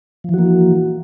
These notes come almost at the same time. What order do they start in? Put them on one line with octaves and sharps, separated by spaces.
F3 E3 F#4 A#3